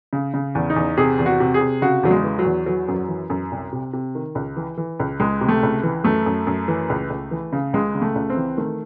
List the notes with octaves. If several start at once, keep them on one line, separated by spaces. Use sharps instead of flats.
C#3
C#3
E2
D#4
E2
C3 G#4
E2
F#4
C3
G#4
C3
C#3 F#4
E2 F#3
G#3
E3
F#3
E2
E3 F#3
F#2
F#3
E3
F#2
C2
C3
C3
D#3
C#2
E3
E3
C#2
C#2 G#3
C3
A3
C#2
E3
F#2 A3
F#2
F#2
E3
C#2
C#2
E3
C#3
C#2 G#3
C#3
A3
C#2
C4
E3
D#3 A3